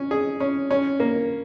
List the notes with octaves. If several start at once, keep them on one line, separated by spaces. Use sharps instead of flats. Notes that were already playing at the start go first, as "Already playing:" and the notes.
Already playing: C#4
G#4
C#4
C#4
A#3